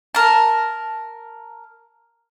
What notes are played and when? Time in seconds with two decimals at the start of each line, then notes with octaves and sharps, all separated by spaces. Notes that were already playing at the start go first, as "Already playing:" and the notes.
0.15 A#4 A5